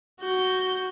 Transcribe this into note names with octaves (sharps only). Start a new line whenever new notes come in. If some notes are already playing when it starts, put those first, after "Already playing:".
F#4 G6